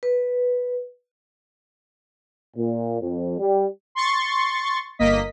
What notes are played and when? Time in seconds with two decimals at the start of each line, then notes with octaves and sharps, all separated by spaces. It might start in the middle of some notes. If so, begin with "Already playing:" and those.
0.03 B4
2.56 A#2
3.01 F2
3.39 G3
3.95 C6 C#6 A6
4.99 G1 A#3 D#5 B6